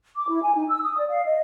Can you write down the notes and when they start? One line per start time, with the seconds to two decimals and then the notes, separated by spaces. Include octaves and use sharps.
0.17 D6
0.29 E4
0.43 G#5
0.55 D#4
0.68 E6
0.83 D#6
0.98 D5
1.09 F5
1.26 D#5